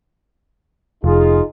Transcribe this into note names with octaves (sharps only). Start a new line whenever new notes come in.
F1 D#4 F4 G#4